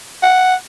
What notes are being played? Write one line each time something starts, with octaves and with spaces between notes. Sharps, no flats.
F#5